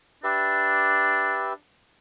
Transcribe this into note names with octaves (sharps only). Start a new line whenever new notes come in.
D4 G4 B4 E5